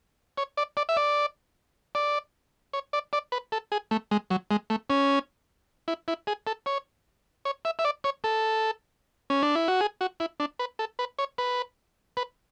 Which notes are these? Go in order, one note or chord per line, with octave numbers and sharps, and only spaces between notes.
C#5
D5
D5
E5
D5
D5
C#5
D5
D5
B4
A4
G#4
A3
G#3
F#3
G#3
A3
C#4
E4
E4
G#4
A4
C#5
C#5
E5
E5
D5
C#5
A4
C#4
D4
E4
F#4
G#4
F#4
E4
D4
B4
A4
B4
C#5
B4
B4